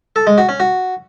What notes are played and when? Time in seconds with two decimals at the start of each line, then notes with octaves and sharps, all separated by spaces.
0.16 A4
0.27 G#3
0.38 F#4
0.49 C#4
0.60 F#4